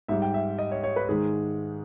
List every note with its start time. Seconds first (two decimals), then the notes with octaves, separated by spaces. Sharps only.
0.08 G#2 G3 E5
0.22 G5
0.34 E5
0.59 D#5
0.71 C#5
0.84 C#5
0.96 B4
1.09 G#2 D#3 G#3 G#4